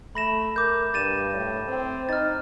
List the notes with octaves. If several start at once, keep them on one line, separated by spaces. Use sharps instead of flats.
A3 B5 A#6 E7
A#4 D6 G6
G2 A6 D#7 E7
A2
C4
D#4 F6 A6